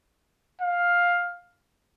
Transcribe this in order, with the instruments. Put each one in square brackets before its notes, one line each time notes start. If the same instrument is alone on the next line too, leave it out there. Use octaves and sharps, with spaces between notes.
[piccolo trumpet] F5